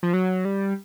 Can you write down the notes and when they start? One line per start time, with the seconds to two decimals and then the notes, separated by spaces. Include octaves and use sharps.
0.03 F3
0.13 F#3
0.45 G3